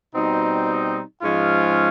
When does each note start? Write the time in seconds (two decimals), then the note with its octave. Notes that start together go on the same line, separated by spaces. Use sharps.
0.14 B2 G3 C4 D#4
1.22 G#2 F3 G#3 C#4 F4